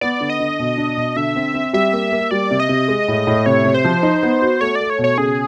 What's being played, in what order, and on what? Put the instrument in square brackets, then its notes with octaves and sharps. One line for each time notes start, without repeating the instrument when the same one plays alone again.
[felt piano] B3 [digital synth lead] D5
[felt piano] D3
[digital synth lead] D#5
[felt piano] D3
B2
D4
B2
[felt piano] D3 [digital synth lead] E5
[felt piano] C4
C4
[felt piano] G3 [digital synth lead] E5
[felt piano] A#3
A#3
[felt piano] G3 [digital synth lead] D5
[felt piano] C3
[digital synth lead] D#5
[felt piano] C3
G#3
A2
A2
[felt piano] C3 [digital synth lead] C#5
[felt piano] C3
[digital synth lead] C5
[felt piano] F3
D#4
B3
F#4
[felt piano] A3 [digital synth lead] C#5
[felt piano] A3 [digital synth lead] D5
[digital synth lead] C#5
[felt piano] B2
[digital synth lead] C#5
[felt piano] C#3 [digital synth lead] G#4